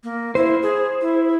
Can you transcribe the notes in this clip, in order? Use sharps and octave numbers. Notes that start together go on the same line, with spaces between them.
A#3
E4 C5
G#4
E4